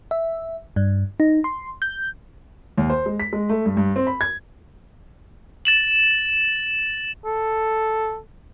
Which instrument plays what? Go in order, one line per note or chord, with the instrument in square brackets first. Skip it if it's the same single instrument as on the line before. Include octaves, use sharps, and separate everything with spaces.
[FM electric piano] E5
G2
D#4
C6
G6
[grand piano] D#2
C5
G#3
B6
G#3
A3
G2
G2
C4
B5
G#6
[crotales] A6 E7 F#7
[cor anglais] A4